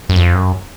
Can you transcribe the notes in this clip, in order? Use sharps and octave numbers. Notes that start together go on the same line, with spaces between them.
F#2
F2
F#2